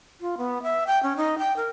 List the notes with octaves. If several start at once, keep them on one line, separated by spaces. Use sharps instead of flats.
F4
B3
E5
G5
C#4
D#4
G5
A#4